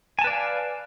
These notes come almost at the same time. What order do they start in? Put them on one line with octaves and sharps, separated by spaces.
G#5 A5 B4 D5 F5